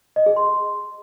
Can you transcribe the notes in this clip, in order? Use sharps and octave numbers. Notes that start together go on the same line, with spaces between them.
D#5
G#4
C6